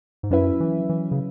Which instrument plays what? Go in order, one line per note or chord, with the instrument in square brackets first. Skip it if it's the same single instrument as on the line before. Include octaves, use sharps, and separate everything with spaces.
[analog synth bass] G#2
[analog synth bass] F#2 [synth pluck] F#3 C#4 E4 B4 E5
[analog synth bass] E3
E3
C#3